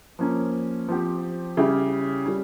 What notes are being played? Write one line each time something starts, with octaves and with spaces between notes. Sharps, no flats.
F3 A#3 C#4
F3 C4 G4
C#3 G3 C#4 E4 G4
G3 C#4